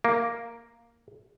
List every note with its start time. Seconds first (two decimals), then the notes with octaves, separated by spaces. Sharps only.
0.04 A#3